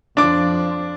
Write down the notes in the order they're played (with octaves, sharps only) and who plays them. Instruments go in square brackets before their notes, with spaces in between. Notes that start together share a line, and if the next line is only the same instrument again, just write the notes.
[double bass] F2 F3 [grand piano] D4 D6